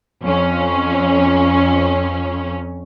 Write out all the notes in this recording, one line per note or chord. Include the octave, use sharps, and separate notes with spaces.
F2 C#4